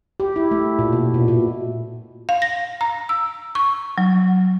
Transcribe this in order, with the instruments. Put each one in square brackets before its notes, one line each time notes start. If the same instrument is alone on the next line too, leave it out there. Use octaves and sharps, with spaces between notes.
[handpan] G4
E4
A3
A#2
B2
B2
A#2
[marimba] F5
A#6
A#5
E6
C#6
F#3